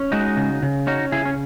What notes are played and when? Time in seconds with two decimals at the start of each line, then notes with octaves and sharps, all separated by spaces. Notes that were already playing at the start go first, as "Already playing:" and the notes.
Already playing: C#4
0.12 G#3 D#4 F#4
0.37 C#3
0.63 C#3
0.87 C#4 D#4 F#4
1.12 C#3 E4 G#4
1.25 C#4